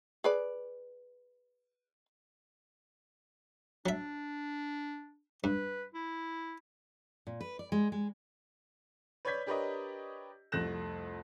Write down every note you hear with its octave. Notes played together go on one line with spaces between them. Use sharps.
G#4 B4 D5
F#3 D4 E5
G2 B4
E4
A#2
B4
D5
G#3
G#3
B4 C#5 D5 G6 G#6 B6
D4 G4 A#4 B4 C#5 D#5
C2 F2 A3 F#6 A#6 E7